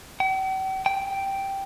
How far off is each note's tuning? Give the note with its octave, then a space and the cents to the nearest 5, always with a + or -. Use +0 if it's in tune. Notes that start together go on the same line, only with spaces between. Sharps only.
G5 -45
G5 -5